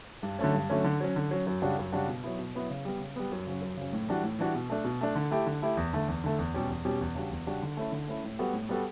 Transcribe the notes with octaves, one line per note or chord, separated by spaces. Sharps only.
G2
D3 F#3 A3 C#4
G2
D3 F#3 A3 C#4
D3
F#3 C#4
D3
F#3 C#4
F#2
C#3 G3 D4 F#4
F#2
C#3 G3 D4 F#4
B2
F#3 B3 E4
B2
F#3 B3 E4
C#3
G3 B3
C#3
G3 B3
F#2
C#3 F#3 C#4
F#2
C#3 F#3 C#4
A2
E3 G3 D4 F#4
A2
E3 G3 D4 F#4
B2
A3 D4
B2
A3 D4
D3
A3 E4 G4
D3
A3 E4 G4
E2
D3 A3
E2
D3 A3
E2
B2 G3 C#4 G4
E2
B2 G3 C#4 G4
E2
C#3 G3 D4 F#4
E2
C#3 G3 D4 F#4
D3
A3 C#4 E4
D3
A3 C#4 E4
A2
G3 B3 F#4 A4
A2
G3 B3 F#4 A4